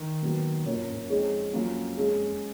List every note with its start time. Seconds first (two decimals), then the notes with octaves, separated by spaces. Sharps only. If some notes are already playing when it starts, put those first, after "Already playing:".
Already playing: D#3
0.22 A#2 F#3 B3 F#4
0.65 B2 A#3 C#4 F4 A#4 C#5
0.76 F#2
0.87 F#2
0.92 G#2
0.99 F#2
1.10 F2 G#3 D#4 G#4 C#5
1.53 F#3 A#3 C#4 F4
1.97 G#3 C#4 G#4